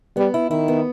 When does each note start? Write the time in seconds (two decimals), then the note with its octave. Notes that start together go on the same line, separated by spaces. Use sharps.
0.17 G3 B3
0.34 E4
0.51 D#3 E4
0.68 B3